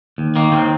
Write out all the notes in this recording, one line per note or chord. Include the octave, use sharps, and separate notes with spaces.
D#2
D#3 A#3
D#2 C4